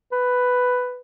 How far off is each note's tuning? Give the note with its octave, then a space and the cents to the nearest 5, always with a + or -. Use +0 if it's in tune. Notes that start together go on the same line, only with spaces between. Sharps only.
B4 +5